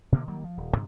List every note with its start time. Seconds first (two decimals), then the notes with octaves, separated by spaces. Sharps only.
0.12 B2 D3 A#3 B3
0.28 D#3 F#3 G3 A#3
0.44 F3
0.57 D#1
0.74 G2 C3 D#3 F#3